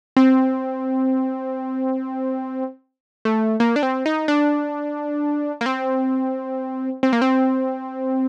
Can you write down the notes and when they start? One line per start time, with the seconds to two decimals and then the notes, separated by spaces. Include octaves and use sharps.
0.17 C4
3.25 A3
3.60 A#3
3.76 D4
3.83 C4
4.06 D#4
4.28 D4
5.61 A#3
5.66 C4
7.03 C4
7.13 A#3
7.22 C4